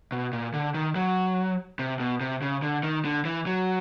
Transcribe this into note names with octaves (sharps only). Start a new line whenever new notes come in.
B2
A#2
D3
D#3
F#3
C3
B2
C3
C#3
D3
D#3
D3
E3
F#3